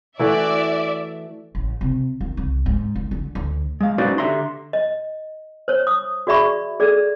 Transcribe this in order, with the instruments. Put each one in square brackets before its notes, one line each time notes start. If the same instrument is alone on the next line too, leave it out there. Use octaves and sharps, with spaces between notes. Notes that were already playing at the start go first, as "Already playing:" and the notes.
[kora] E3 A3 F#4 [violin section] D5 E5
[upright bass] A1
C3
D#3
C2
G#2
D#3
D3
D2
[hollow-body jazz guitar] G#3 F5
C#4 D#4 F#4 B4 C5 D5
D3 G4 E5 A#5 C6
[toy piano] D#5
C5 C#5
D#6
F#4 G#4 D5 E5 B5 C#6
G#4 A4 D5